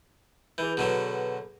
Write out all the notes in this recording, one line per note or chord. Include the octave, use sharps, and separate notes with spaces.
E3 G#4 B4 G6
B2 D3 F#3